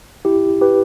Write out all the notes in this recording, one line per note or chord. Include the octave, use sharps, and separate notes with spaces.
E4 G4
G4 B4